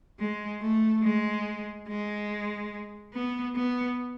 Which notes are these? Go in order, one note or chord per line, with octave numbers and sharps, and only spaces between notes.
G#3
A3
G#3
G#3
B3
B3